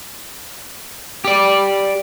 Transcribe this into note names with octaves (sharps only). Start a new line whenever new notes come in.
G4 D5